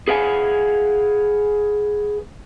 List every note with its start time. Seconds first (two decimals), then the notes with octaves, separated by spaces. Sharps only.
0.08 G#4 B4 F5 F#5 G#5